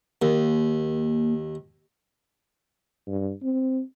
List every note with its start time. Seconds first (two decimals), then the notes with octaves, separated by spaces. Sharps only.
0.22 D#2 A#3
3.07 G2
3.43 C4